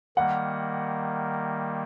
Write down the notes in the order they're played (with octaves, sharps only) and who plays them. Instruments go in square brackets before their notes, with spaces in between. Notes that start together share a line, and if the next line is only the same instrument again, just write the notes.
[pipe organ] D#3 G3 A#3 [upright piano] F#5